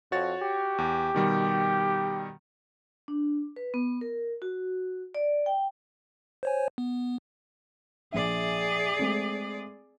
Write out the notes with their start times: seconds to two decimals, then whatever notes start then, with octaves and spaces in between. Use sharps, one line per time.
0.12 F2 F#4 C#5 A6
0.42 G4
0.78 E2
1.14 B2 D#3 G3
3.08 D4
3.56 B4
3.74 B3
4.01 A#4
4.42 F#4
5.15 D5
5.46 G5
6.43 C5 C#5 G#5
6.78 B3
8.12 A#1 G#4 D5 E5
8.99 G#3 A3 C4